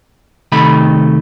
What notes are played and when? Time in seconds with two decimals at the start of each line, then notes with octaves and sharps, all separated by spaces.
0.52 C3 D#3 A3 B5